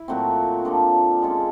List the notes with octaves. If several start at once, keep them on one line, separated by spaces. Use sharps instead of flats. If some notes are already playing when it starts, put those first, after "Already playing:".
Already playing: E4
A#2 F#3 A3 C4
D3 F3 A#3 D4
G#3 C#4 F4 A4